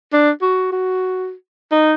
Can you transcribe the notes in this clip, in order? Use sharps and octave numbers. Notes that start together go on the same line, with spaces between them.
D4
F#4
F#4
D#4